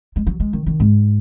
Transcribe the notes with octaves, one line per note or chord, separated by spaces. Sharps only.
G#3
F#3
G#3
D#3
D#3
G#2